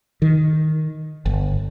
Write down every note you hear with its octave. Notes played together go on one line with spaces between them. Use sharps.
D#3
G1